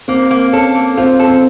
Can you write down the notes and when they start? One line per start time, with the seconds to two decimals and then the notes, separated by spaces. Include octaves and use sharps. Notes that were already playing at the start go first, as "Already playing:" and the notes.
0.08 A#3 C4
0.31 A#3
0.53 C#4 A4
0.75 A#3
0.97 C4 F4
1.19 A4
1.27 C4